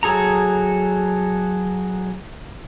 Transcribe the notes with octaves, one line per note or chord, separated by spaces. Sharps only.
F#3 G#4 A4 A#5